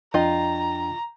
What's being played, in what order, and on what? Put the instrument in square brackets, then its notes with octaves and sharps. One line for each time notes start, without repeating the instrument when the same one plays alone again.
[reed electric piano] F2 D4 G5 [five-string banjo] F4 D#5 [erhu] A#5